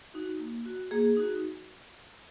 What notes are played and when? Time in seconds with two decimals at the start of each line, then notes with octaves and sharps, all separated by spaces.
0.14 D#4 F#4
0.40 A#3
0.66 F#4
0.91 A#3 G#4
1.17 D#4 F#4